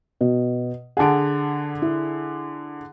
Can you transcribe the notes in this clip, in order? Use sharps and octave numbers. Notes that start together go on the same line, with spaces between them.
B2
D3 G#4 F#5 A5 D7
E4